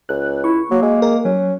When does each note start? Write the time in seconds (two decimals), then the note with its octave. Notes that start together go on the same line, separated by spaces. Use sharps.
0.09 C#2 F#6
0.44 E4 C#6
0.71 F#3 A#3
0.83 G#3
1.02 G#3 A#4
1.25 F#3 C#4